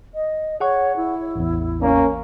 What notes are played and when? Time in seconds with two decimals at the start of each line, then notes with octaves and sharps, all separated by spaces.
0.15 D#5
0.60 G#4 C#5 F#5 C#6
0.96 E4
1.36 A1 E2
1.82 A#3 C#4